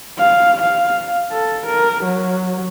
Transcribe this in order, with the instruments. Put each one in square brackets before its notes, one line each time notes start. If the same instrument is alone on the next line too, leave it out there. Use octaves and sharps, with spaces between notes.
[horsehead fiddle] F5
F5
A4
A#4
F#3